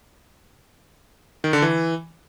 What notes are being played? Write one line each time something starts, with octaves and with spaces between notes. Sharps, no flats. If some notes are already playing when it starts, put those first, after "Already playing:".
D#3
D3
E3